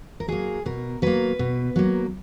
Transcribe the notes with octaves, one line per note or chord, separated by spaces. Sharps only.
A#4
F#3 A#3 G#4
B2 A#4
F#3 A#3 B4
B2
F#3 A#3